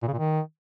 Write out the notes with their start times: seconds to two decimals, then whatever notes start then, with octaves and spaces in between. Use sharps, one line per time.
0.02 A#2
0.08 C#3
0.13 A#2
0.18 D#3